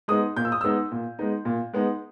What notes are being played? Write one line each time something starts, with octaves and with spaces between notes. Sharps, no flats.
G#3 B3 D#4 D#6
A#2 G6
E6
D#6
G#3 B3 D#4 E6
A#2
G#3 B3 D#4
A#2
G#3 B3 D#4